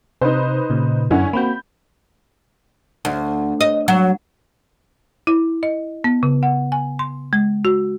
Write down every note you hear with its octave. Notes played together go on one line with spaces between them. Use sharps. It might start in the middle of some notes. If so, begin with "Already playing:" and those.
C3 D#4 B4 C5
A#2 C#3
F#2 D3 C#4 E4 F#5
A#3 C4 F#4 B5 G6
D2
D#5
F#3
E4
D#5
B3
C#3
F#5
G#5
C6
G#3
F#4